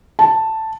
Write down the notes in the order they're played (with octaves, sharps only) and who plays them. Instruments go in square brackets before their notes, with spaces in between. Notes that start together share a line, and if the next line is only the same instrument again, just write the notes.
[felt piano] A5